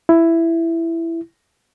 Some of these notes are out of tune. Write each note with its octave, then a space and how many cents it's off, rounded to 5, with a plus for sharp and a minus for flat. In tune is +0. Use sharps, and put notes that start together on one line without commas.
E4 +10